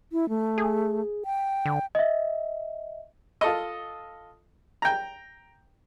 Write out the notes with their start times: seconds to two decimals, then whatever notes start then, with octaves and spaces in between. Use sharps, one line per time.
0.12 E4
0.29 A3
0.58 G#4
1.25 G5
1.66 D3
1.95 D#5 E5
3.41 F4 A4 D#5
4.82 G5 A#5